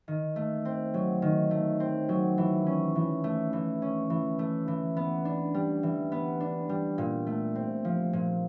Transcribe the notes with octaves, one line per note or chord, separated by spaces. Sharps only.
D#3
A3
C4
F#3
D#3
A3
C4
F#3
E3
C#4
E3
A3
E3
C#4
E3
A3
E3
B3
D4
G3
E3
B3
D4
G3
A#2
A3
C4
F3
A#2